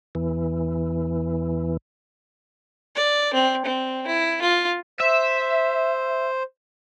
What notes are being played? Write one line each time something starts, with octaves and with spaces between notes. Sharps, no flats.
E2 E3
D5
C4
C4
E4
F4
C5 E5